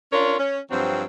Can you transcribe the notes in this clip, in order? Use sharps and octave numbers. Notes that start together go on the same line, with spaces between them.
C#4 D4 F4 A#4 C#5
C#4
G2 F3 F#3 C4